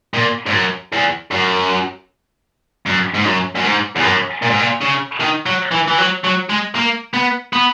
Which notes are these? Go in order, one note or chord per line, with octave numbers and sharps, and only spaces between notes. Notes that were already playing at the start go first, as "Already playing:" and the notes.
A#2
G#2
F#2
E2
F#2
F#2
G#2
F#2
F#2
G#2
E2
F#2
A#2
G#2
A#2
C#3
D#3
F#3
E3
E3
F#3
F#3
G#3
A#3
B3
B3